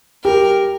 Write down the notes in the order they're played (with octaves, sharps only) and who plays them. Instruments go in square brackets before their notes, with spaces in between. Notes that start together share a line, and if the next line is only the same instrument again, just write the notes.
[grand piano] G4 [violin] A#4